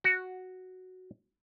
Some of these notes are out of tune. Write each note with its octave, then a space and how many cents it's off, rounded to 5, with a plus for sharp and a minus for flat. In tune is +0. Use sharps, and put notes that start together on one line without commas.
F#4 +0